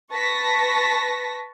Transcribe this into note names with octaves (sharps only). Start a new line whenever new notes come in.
B4 A5 C#6 A#6 B6